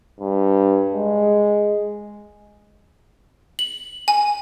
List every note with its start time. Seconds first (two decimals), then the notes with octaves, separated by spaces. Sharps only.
0.20 G2
0.94 G#3
3.59 F#7
4.08 G#5